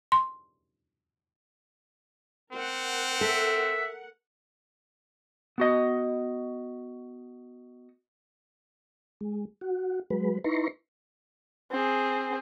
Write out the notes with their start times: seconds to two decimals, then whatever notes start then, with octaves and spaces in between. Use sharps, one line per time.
0.12 C6
2.52 C4 A#4 F#5
3.21 A4 E5
5.58 B3 F#4 D#5
9.21 G#3
9.61 F#4
10.10 F#3 G#3 B4
10.44 D#4 E4 B4 A#5 C6 C#6
11.71 C4 G#4